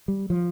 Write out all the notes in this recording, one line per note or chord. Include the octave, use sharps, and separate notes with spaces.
G3
F3